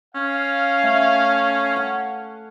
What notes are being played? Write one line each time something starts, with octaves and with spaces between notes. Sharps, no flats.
C#4 F5
A3
F#5